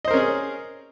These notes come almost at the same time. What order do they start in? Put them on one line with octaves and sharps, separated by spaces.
D#5 C5 A#4 C#4 G#4